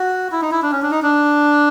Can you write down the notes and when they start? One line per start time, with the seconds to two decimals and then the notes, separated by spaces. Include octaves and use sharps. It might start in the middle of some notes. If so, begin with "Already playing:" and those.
Already playing: F#4
0.32 E4
0.41 D#4
0.52 E4
0.62 D4
0.72 C#4
0.82 D4
0.91 D#4
1.02 D4